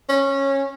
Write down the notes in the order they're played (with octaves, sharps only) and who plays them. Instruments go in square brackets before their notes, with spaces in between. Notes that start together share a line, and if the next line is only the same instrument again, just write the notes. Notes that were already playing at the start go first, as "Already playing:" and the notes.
[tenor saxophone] C#4